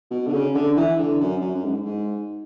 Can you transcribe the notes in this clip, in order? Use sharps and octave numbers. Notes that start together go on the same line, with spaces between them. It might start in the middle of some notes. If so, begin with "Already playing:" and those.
B2
D3
C#3
D3
E3
D3
F#2
F#2
F#2
G#2
G#2